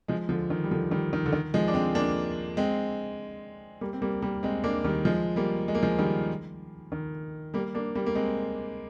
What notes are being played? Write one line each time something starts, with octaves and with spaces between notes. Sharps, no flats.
F3 G#3
D3 F3
D#3
G3
D3 F3
D#3 G3
D#3
D3
D#3
F3 G#3
D4
G#3 C4
A#3 D4
G#3 C4
G3 A#3
C4
G3 A#3
G3 A#3
G#3 C4
A#3 D4
D#3 G3
F3 G#3
G3 A#3
G#3
A#3
F3 G#3
D#3 G3
D#3
G3 A#3
A#3 D4
G3 A#3
A#3
G#3 C4